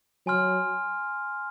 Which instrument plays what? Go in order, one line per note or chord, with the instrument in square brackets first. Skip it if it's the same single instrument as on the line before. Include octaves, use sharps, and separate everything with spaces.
[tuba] F#3 [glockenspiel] G#5 C6 F6